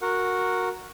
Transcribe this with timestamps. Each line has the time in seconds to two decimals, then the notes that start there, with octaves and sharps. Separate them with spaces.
0.02 F#4 A#4 F#5